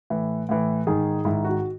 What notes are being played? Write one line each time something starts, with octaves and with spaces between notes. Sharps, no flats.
A2 E3
A2 E3
G#2 D#3 G#4
G#2 D#3 E4
F#4